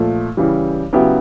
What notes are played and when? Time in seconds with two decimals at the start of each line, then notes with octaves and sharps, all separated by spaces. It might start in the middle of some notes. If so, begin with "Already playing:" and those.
Already playing: A#2 F3 A3
0.37 C#3 E3 G3
0.93 C#3 F#3 B3 E4 G4